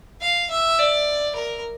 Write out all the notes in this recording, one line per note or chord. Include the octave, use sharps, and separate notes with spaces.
F5
E5
D5
A#4